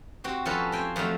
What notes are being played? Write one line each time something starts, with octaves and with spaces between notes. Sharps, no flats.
C4 F#4 G4
F3 C#4 F4 F#4 A4 B4
C4 G5 G#5 C6
F2 F3 F#3 A3